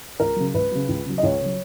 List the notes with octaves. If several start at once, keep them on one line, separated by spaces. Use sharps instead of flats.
C#2 A#4
C#3 F#3
C#2 B4
C#3 F#3
C#2
C#3 F#3
D#5
C#2 C#5
C#3 F#3